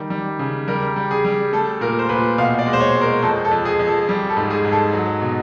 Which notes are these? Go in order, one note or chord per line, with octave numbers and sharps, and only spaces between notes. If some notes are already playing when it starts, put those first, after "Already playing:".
Already playing: D#3 G3
G3
C#3
G3 A#4
G3
G#4
G3
A3 A4
A#2 A#4
C5
A#2 B4
B2 F5
D5
G#3
C5
C#5
G#3
A#4
F2 A4
A4
F2
G#4
F2
A4
G3
A4
G#2
G#4
G#2
A4
F#3
B2